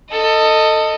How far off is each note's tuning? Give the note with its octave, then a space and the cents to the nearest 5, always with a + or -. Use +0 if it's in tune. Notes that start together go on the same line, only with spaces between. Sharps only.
A4 +20 D#5 +0